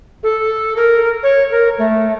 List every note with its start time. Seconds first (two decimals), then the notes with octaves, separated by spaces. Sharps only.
0.23 A4
0.77 A#4
1.23 C#5
1.51 A#4
1.78 A3